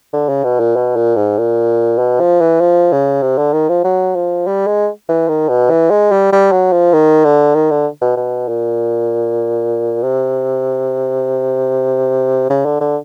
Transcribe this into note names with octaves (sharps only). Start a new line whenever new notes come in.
D3
C#3
B2
A#2
B2
A#2
G#2
A#2
B2
F3
E3
F3
C#3
C3
D3
D#3
F3
F#3
F3
G3
G#3
E3
D#3
B2
E3
G#3
G3
G3
F#3
F3
D#3
D3
D#3
D3
B2
B2
A#2
C3
C#3
D3
D3